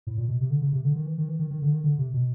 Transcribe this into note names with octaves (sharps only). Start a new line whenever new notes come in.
A2
A#2
B2
C3
D3
C#3
C3
D3
D#3
E3
D#3
E3
D#3
D#3
D3
D#3
D3
C3
B2